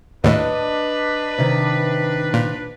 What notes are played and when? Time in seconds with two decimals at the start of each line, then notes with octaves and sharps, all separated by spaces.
0.24 D#2 A2 D4 B4 D#5
1.38 C3 D#3
2.34 A#2